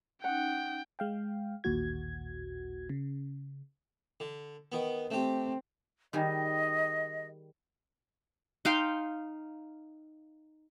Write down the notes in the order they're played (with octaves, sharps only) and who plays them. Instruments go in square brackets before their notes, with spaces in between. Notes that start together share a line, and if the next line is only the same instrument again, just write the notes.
[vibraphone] C#4 D#4 [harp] F#5 [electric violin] G5
[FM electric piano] G#3 F5 G5
A1 D#2 A#2 F#4 G#6
C#3
[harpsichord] D3
D#3 B3
[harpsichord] A3 G4 [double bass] C4
[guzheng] D#3 G3 G#4 [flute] D#5
[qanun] D#4 F5 G5 C6